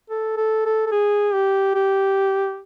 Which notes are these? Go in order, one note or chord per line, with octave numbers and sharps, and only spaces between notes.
A4
A4
A4
A4
G#4
G4
G4